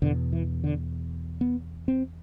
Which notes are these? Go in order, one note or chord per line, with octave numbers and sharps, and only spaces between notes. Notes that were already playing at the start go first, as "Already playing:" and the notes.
E2 B2 D3
E3
D3
B3
C4